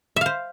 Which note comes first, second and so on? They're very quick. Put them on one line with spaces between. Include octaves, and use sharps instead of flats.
E5 F5 C5